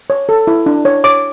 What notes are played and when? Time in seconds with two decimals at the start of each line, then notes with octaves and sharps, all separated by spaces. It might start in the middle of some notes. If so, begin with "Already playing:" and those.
0.10 C#5
0.29 A4
0.47 E4
0.66 D4
0.85 C#5
1.04 C#5 D6